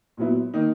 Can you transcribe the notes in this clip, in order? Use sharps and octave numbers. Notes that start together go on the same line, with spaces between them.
A#2 F#3 B3 E4
D#3 A#3 D#4